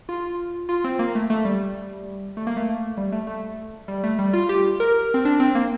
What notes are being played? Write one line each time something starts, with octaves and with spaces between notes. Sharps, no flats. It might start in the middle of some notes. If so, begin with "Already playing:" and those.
F4
F4
C4
A#3
A3
A3
G3
A3
A#3
A3
G3
A3
A3
G3
A3
G3
F4
G4
A#4
C4
D4
C4
A#3